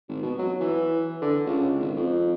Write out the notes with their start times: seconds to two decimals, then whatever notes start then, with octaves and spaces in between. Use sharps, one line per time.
0.09 G#1
0.23 B2
0.38 F#3
0.60 E3
1.22 D3
1.46 C#2
1.80 G#1
1.96 F2